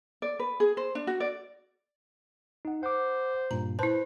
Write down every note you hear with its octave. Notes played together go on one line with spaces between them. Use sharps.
D5
B4
G#4
C5
D4
F#4
D5
D#4 F#5
C5 F#5 D6
G2 A#2 A#5
E4 B4 C5 A5